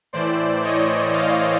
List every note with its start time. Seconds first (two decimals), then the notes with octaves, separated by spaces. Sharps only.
0.13 A2 E3 C5 D5
0.63 C#5 D#5
1.13 D#5 F5